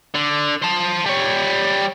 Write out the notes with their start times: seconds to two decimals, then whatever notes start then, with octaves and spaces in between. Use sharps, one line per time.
0.14 D3
0.62 C5 A5
1.06 G3 C#5